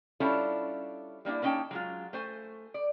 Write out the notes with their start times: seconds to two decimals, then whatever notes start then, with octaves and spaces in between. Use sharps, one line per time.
0.20 G3 C#4 D4 E4 F4 A4
1.25 G3 A#3 D4 E4
1.42 A#3 B3 C#4 D#4 G5 A5
1.71 F#3 G#3 F4
2.13 A3 C5 G#5
2.74 D5